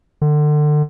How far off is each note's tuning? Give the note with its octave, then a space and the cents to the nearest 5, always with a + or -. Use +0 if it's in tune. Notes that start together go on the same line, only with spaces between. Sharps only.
D3 +30